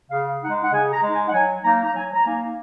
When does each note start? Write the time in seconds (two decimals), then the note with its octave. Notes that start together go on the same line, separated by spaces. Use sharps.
0.11 C#3 F5
0.41 G#3 D#4 F#5
0.61 F#5
0.72 C#3 G#5
0.92 A#5
1.02 G#3 D#4
1.13 G#5
1.28 F#5
1.33 F#3 G#5
1.63 A#3 D#4 A#5
1.84 A#5
1.94 F#3 G#5
2.13 A#5
2.24 A#3 D#4 G#5